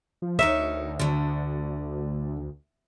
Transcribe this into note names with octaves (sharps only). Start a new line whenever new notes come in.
F3
D2 D#4 A#4 C#5 E5
D3 A3